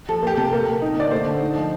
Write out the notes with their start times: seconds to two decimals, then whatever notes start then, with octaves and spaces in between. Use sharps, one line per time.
0.09 F3 A4
0.23 A#3 G4
0.37 C3 A4
0.53 A#3 A#4
0.67 A#2
0.82 D#4
0.96 D3 D5
1.11 A3 C5
1.26 D3
1.40 D#4
1.55 F3